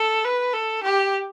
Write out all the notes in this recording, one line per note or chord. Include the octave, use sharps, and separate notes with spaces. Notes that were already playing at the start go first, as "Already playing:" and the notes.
Already playing: A4
B4
A4
G4